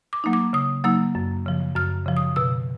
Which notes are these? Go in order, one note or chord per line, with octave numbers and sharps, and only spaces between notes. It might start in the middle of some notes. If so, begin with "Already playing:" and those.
D6
F#3 A#3 D#4
D6
C#3 D#6
F#3 A#3 D#4 E6
F#2
C#3 F3
F#2 F6
C#3 F3
D#6
B2 E6